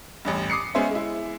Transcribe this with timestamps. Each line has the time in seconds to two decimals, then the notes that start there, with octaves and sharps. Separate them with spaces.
0.25 A1 E2 G2
0.50 D6 D#6 C7 C#7
0.75 G#3 B3 C#4 G#4 C5 E5
0.91 G#3 E4